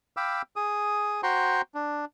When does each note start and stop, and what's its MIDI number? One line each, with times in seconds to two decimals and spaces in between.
0.17 0.42 77
0.17 0.42 79
0.17 0.42 83
0.17 0.42 86
0.17 0.42 88
0.56 1.21 68
0.56 1.21 87
1.23 1.62 66
1.23 1.62 72
1.23 1.62 79
1.23 1.62 82
1.23 1.62 84
1.23 1.62 85
1.74 2.05 62